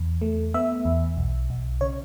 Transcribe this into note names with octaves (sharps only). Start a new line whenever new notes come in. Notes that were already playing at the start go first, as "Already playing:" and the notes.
Already playing: E2
A3
B3 E5
E2
B1
B1
C#3 C#5